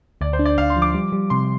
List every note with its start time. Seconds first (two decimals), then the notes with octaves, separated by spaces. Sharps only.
0.21 D2 D5
0.33 C5
0.39 D4
0.46 D5
0.58 D2 F5
0.70 C6
0.77 F3
0.82 D6
0.94 G3
1.13 G3
1.30 C3 C6